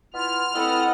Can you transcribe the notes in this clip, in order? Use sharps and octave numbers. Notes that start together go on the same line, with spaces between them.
B3 E4 F4 F6
C4 E4 A4 B4 D#5 F#5 B5